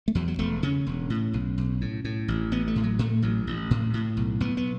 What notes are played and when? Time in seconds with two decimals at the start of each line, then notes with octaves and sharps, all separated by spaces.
0.08 A3
0.15 E2 F#3
0.28 F#3
0.39 E1 A3
0.63 C#3 C#4
0.86 E1
1.10 A2
1.34 B1
1.58 B1
1.81 A2
2.05 A2
2.28 A1
2.52 A1 B3
2.68 A3
2.76 A2
2.83 F#3
2.99 A2 A3
3.22 A1 F#3
3.47 A1
3.71 A2
3.94 A2
4.17 B1
4.40 B1 B3
4.57 B3